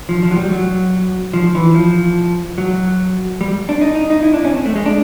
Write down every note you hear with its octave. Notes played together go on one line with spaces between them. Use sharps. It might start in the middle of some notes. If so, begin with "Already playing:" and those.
F3
F3
F#3
G3
F#3
F3
E3
F3
F#3
G3
D4
D#4
D#4
D#4
E4
D4
C#4
C4
A3
G#3
D4